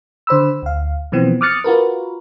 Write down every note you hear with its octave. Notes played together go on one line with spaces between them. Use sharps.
D3 C5 B5 E6
D2 F5
B2 E3 F3 B3 C4
D6 D#6 F6 F#6 A6 C#7
F4 F#4 A#4 B4